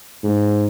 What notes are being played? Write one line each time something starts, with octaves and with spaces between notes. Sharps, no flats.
G#2